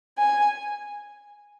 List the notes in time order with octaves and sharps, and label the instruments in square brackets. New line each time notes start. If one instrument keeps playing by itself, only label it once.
[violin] G#5